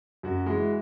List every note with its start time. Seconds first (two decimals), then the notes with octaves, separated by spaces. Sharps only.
0.23 F#2 F#4
0.46 E3 G#3